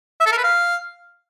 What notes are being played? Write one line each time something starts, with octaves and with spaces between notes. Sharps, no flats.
E5
A4
A#4
B4
F5